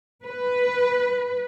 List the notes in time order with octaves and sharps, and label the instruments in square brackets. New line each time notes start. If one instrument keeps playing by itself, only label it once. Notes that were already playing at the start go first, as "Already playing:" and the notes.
[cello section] B4